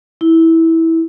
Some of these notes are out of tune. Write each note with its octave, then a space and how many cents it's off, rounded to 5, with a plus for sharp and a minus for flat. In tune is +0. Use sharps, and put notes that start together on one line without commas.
E4 -15